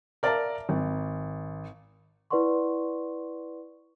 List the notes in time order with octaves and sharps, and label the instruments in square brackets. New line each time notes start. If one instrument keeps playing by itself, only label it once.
[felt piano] A#4 D5 E5 F5 A5 A#5
G#1
[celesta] E4 B4 D5 F#5 C6 C#6